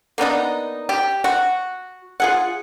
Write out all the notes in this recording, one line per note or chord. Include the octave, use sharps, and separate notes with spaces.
A#3 B3 D4 D#4
G4
F#4
F4 G#4 F#5